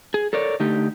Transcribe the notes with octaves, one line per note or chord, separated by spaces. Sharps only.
G#4
A4 A#4 C#5 D5
D3 A3 D#4 G4